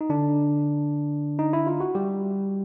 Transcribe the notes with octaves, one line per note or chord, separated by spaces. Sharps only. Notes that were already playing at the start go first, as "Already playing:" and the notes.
D#4
D3 D4
D#4
E4
F4
F#4
G3 G4